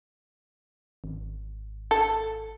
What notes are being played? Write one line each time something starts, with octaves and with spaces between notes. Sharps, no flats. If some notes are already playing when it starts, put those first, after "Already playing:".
G#1
A4